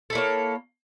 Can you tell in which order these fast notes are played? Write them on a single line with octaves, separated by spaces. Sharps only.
A4 E4 A#3 C#5